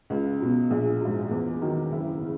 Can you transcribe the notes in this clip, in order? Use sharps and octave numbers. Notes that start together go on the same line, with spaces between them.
C#2
B2 F#3
A#1 G#4
G#2 F#3
E2
D#3 F#3
F#1 E4
C#3